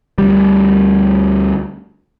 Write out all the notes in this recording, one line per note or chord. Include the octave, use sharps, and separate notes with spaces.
D2 G3